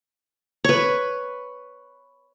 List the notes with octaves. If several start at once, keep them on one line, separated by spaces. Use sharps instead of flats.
B4 C#5